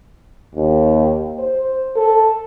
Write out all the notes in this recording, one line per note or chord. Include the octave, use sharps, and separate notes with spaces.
D#2
C5
A4